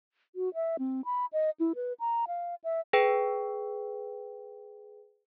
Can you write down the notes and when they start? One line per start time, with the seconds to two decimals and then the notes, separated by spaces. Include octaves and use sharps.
0.36 F#4
0.54 E5
0.79 C4
1.05 B5
1.33 D#5
1.60 E4
1.75 B4
2.00 A#5
2.28 F5
2.64 E5
2.93 G#4 B4 G5